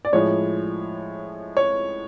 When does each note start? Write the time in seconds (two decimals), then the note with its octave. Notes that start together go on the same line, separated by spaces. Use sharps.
0.05 D5
0.12 A2 F3 G#3 C#5
1.57 C#5